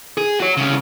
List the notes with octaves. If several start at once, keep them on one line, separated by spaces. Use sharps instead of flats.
G#4
F#4 C#5
C2 C#3